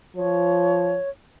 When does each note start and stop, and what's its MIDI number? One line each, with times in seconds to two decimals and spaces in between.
0.16 0.97 53
0.16 1.09 73